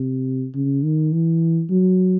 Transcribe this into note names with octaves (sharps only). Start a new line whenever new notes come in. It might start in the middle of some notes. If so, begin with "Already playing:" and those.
Already playing: C3
C#3
D#3
E3
F#3